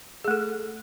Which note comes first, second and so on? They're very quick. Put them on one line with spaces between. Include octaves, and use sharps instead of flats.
G#4 A3 A4